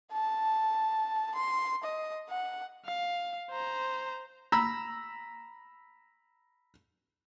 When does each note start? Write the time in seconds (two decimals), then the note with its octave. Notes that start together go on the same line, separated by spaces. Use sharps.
0.13 A5
1.35 C6
1.83 D#5
2.29 F#5
2.86 F5
3.51 C5 A#5
4.52 A#5 B5 E6